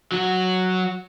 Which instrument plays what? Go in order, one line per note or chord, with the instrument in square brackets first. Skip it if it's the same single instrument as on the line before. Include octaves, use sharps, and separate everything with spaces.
[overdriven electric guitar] F#3 F#4